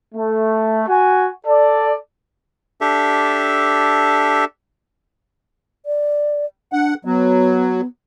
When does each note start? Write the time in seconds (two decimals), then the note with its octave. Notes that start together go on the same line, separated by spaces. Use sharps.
0.15 A3
0.88 F#4 G#5
1.47 A4 D5
2.81 D4 G4 A4 E5
5.86 D5
6.73 D4 F#5
7.05 F#3 B3